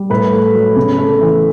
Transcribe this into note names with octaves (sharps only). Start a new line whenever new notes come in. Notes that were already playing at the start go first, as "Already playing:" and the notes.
Already playing: G3
A2 B4
A3
F#3
C#3
A3
E3